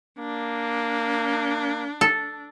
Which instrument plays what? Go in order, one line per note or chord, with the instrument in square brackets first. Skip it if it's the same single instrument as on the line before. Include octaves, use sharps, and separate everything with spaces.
[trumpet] A#3 [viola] D4
[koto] A4